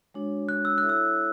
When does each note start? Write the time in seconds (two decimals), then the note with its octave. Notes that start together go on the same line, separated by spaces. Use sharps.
0.14 G#3 D4 F#4 C#5
0.49 F#6
0.65 E6
0.78 E4 A4 C#5 E5 F#6
0.89 E6